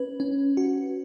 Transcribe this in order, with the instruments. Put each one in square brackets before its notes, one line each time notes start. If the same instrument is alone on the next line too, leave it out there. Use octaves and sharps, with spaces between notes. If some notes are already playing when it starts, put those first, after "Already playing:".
Already playing: [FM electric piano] C#4 B4
C#4
F#4